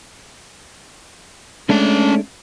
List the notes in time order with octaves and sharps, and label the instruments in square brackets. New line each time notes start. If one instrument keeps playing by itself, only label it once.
[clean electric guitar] G#3 A3 D4 [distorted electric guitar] C#4 A5